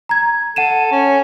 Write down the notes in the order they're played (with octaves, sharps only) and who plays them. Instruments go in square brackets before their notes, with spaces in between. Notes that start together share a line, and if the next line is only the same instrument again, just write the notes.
[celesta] A#5 G#6
[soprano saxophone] A4 [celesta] F#5 D#7 E7
[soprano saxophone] C#4